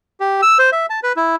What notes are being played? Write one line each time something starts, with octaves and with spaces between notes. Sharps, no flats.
G4
E6
C5
E5
A5
B4
E4